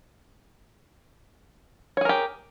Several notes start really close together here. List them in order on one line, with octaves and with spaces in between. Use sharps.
C#5 G#4 A#4 G4